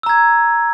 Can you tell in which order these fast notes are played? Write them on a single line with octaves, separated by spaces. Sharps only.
E6 A#5 G#6